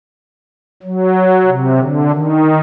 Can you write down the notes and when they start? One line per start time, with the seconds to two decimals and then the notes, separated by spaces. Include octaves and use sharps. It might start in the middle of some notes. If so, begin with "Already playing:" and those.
0.83 F#3
1.47 C3
1.78 D3
2.11 D#3